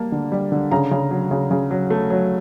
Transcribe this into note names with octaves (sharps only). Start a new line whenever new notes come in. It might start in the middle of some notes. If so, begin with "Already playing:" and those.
Already playing: G3 A#3 A5
D3
G3
D3
C#3 A#5
C#3
F#3
C#3
C#3
F#3
A3
F#3